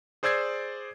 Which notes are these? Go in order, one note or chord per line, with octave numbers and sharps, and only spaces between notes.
G#4 C5 D5 E6 G#6 C7